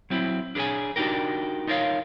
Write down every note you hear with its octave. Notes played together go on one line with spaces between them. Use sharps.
F#3 C4 E4
D4 G#4 A#4 C#5 G#5
D4 D#4 F#4 G4 A#4
D#4 F4 A#4 C#5 F5